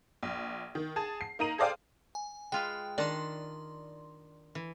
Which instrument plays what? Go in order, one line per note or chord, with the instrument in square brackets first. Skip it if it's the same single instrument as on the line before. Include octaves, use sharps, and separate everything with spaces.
[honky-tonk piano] A#1
D#3
G#4 A5
C7
A#3 D#4 A#5 D#7 F#7
G#4 A4 C5 D5 F5 G5
[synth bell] G#5
[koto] G#3 F4 B4 [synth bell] G5
[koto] D#3 D4 A5 [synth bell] D5 C6
[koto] E3